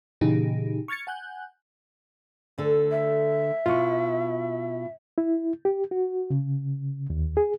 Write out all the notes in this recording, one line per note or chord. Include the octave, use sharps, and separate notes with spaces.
A#2 C#3 E3 D#4 G4 G#4
C#6 F6 G#6 A6 C#7
F#5 G#5 F#6 G6
D2 D3 A4
E5
B2 E4 F4 C#6
E4
G4
F#4
C#3
D#2
G#4